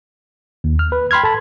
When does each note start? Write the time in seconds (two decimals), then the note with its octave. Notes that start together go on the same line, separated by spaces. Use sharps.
0.64 D#2
0.79 F6
0.92 B4
1.11 G5 B5 C6 F6 G#6
1.23 A4 A5 B5